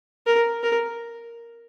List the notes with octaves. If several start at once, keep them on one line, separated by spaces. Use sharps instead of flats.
A#4
A#4